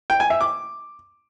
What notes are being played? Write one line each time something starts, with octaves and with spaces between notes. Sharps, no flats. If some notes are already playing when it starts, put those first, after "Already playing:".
G5
G#5
E5
D6